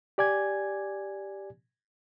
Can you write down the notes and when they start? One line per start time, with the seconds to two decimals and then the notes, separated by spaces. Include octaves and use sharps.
0.18 G4 D5 G#5 G#6